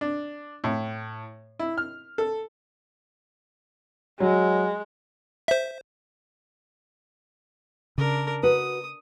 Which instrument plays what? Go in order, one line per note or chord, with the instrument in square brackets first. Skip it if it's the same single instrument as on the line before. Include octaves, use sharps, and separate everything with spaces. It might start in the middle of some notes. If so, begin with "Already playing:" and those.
[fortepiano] D4
A2
E4
F6
A4
[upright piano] F#3 [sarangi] G#3
[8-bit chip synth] C5 E5
[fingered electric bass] C#3 [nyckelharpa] D4 A#4
[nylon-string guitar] F#4 B4 [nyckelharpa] D#6